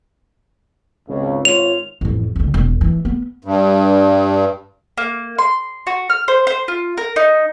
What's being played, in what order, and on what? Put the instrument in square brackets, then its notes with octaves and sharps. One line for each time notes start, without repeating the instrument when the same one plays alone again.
[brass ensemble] G#1 C#2 C#3
[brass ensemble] G#1 F4 C#5 [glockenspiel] F7
[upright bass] A1 F2
C#2 D3
E1
E3
B3
[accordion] G2
[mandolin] A#3
C6
F#4
F6
C5
C5
F4
A#4
D#4